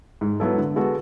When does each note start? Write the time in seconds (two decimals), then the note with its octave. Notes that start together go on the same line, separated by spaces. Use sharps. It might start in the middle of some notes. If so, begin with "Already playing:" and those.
0.21 G#2
0.40 F#3 B3 E4 A4
0.58 D3
0.76 G#3 B3 F#4 A4